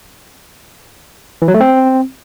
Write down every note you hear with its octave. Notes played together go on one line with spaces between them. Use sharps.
E3
F#3
A3
C4